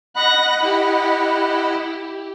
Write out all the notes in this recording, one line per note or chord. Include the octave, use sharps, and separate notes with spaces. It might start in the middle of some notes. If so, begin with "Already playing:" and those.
D#5 F#5 B5 F#6 A#6
E4 G4